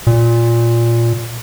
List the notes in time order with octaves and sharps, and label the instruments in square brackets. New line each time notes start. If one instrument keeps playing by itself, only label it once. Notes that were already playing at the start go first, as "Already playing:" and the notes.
[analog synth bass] A#2